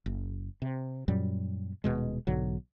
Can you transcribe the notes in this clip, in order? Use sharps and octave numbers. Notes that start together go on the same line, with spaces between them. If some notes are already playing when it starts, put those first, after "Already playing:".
F#1
C3
F#2 A#2 F#3 G3
D#1 A#1 B2 G#3
B1 G#2 D3 F#3